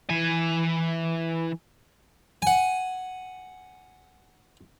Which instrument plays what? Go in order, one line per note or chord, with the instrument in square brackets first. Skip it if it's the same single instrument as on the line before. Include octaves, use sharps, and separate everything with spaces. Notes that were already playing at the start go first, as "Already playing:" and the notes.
[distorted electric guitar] E3 G#5
[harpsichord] F#5 G#5